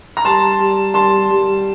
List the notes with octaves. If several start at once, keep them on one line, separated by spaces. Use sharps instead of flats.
A#5
G3 A5 C6
G3
G3 A5 C6
G3